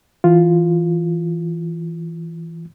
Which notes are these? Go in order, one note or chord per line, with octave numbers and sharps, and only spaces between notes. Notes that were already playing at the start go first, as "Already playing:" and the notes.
E3 F4